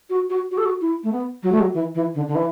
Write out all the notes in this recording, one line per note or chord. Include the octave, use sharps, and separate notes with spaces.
F#4
F#4
F#4
A4
F#4
E4
A3
B3
F#3
A3
F#3
E3
E3
D3
D3
E3